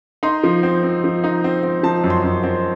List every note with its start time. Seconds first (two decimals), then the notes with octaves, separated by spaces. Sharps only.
0.23 D#4 C6
0.43 F3
0.63 C4
0.83 C4
1.04 F3
1.24 D#4
1.44 C4
1.63 C4
1.83 F3 A5
2.04 F#2
2.10 C6
2.24 F#2
2.43 C4